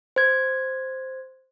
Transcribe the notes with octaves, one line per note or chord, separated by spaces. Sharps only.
C5 G#6